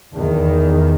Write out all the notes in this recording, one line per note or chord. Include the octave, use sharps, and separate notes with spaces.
E2 D#3